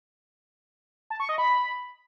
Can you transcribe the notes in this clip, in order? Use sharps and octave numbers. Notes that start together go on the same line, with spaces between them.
A5
C#6
D#5
B5